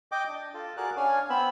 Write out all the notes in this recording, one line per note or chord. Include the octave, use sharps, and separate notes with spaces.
D#5 G5 D6
D4
F4 A4
F#4 G#4 A#4 D5 D6 F#6
C#4 D4 C#5 F5 G#5
B3 C4 B5 E6